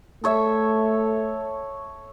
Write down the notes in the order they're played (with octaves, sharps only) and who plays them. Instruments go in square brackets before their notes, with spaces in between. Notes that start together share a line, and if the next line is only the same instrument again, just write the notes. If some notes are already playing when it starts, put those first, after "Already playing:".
[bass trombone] A3 [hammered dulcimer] A4 C#5 E5